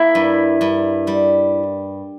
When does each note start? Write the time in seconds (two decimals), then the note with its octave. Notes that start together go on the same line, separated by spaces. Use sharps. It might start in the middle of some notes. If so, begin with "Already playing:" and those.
Already playing: A#3 E4
0.15 G2
0.61 G2
1.07 G3